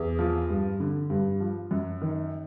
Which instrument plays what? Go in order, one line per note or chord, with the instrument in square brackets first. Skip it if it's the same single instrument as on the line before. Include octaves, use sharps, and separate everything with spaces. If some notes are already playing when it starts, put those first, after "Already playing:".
Already playing: [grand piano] E2
F3
G2
D3
G2
F3
F#2
D#3